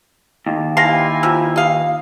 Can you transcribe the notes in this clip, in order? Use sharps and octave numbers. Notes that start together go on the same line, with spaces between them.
D#2
F3 E4 F4 G4 G#5 A#6 C7
F3 F4 E6
G4 D#5 F5